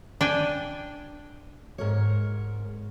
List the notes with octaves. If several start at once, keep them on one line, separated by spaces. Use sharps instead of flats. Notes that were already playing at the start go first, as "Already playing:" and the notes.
D4 G5 G#5
G#2 A#4 C#5